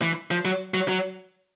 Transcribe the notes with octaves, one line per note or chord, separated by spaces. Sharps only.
E3
F3
F#3
F#3
F#3